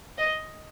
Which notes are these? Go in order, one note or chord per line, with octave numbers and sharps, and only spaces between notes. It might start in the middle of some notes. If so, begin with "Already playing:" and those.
D#5